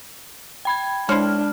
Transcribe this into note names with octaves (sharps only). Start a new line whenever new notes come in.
G5 B5 G#6
G#3 D4 E4 C5 C#5 F6